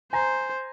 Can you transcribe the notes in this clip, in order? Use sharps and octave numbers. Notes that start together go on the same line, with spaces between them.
C5 G#5 A#5